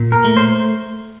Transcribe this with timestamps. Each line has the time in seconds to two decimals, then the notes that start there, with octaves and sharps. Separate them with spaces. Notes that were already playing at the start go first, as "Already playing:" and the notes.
Already playing: A#2
0.12 A#4
0.25 A3
0.37 C5